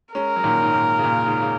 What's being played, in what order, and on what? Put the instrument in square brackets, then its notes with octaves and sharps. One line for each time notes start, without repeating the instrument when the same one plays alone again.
[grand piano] G#3 C#4 [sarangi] A#4
[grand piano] F#3
A#2 D#3
G#2
A#2
C#3
A#2
G#2 C#3
C#3